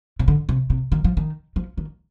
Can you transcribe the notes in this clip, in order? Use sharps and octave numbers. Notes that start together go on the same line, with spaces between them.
C3
D3
C3
C3
D#3
F3
D#3
F3
D#3